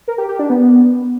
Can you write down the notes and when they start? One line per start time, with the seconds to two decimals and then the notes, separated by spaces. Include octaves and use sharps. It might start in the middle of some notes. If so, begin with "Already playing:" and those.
0.08 A#4
0.18 G4
0.29 G4
0.39 D4
0.50 B3